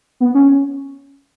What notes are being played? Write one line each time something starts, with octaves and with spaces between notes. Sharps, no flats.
B3
C#4